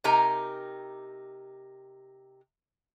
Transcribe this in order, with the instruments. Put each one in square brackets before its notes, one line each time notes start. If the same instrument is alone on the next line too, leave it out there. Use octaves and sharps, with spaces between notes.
[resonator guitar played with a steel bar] C3 D#4 G4 A#4 G#5 A#5